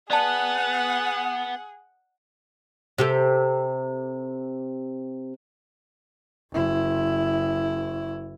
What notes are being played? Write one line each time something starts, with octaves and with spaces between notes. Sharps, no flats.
B3 G#4 D5 F#5 A5
C3 G4 A4
F#1 E4